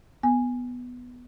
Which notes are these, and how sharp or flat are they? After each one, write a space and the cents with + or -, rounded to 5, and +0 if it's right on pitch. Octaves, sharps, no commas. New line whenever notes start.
B3 +0 G#5 -5